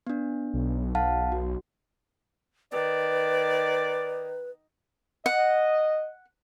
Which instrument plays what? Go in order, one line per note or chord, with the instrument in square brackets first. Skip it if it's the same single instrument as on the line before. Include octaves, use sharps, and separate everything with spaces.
[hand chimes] B3 D4
[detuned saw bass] B1
[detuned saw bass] B1 [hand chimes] F5 F#5 A5
[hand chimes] F#4
[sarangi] D#3 [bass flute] B4 [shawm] D5
[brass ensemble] D#5 [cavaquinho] F#5